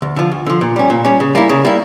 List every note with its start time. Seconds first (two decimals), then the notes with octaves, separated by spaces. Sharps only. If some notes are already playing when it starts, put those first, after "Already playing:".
0.02 D2
0.16 D3 F3
0.32 D2
0.46 D3 F3
0.61 A#2
0.76 G3 C#4
0.90 A#2
1.05 G3 C#4
1.20 C#3
1.35 G3 A#3 E4
1.49 C#3
1.65 G3 A#3 E4